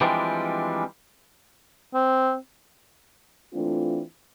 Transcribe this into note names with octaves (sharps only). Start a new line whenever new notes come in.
E3 F3 G3 G#3 C4 D4
C4
E3 A3 C4 D4 F4